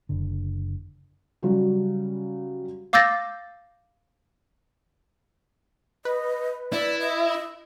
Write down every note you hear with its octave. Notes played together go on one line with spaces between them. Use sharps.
F#1 D3
C#3 F#3 G3 F#4
F5 D6 E6 G6 A6 A#6
B4 D#5
E4 D5
D#5